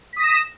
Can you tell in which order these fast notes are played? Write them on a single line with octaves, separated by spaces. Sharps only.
B6 D#6 A#6 E7